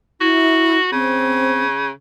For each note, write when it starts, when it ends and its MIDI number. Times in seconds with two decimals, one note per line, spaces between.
0.21 0.78 64
0.21 0.91 66
0.92 1.91 49
0.92 1.63 60